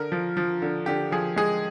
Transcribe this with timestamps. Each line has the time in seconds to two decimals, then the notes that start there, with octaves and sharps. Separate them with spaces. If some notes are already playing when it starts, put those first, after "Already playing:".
Already playing: D3 A#4
0.12 F3
0.37 F3
0.62 D3
0.86 D3 G4
1.12 F3 G#4
1.36 G#3 G#4